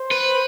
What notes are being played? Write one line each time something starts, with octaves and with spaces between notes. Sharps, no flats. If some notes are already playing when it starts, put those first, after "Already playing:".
Already playing: C5
B4